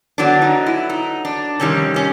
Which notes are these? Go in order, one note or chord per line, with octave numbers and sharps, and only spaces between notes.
D3 F#3 B3 D4
D#4
E4
D#4
D4
F2 C3 D#3 G3 C#4
C#4